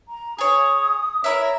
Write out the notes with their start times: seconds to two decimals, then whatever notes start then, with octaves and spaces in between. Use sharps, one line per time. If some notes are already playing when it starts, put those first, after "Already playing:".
0.08 A#5
0.38 G#4 C#5 D#6
1.24 E4 A#4 C#5 E5